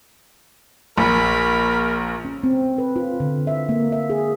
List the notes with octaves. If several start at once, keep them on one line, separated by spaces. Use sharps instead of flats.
A#1 A#4 B5
C#4
C4
B4
F4
D3
E5
A#3
E5
G#4